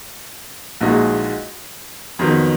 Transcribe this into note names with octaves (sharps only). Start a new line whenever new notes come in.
A#1 A#2 G#3 D#4 F#4
F2 D#3 F#3 B3